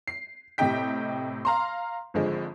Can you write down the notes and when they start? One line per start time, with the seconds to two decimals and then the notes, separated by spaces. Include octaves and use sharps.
0.08 C7
0.58 A2 C3 G4 D#5 G5 B6
1.45 F5 A#5 C6
2.14 G#1 D3 F3 G#3